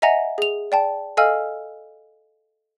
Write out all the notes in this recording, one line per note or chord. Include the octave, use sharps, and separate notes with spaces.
D#5 E5 F#5 G#5 A#5 A#6
G#4 F7
D5 G5 A5
A4 D#5 F5 G#5 E6 F6